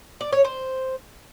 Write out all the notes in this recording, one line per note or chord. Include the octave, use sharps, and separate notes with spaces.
D5
C#5
C5